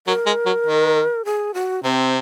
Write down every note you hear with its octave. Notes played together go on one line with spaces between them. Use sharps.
F#3 A#4
G#3
F#3
D#3
G#4
F#4
C3 C4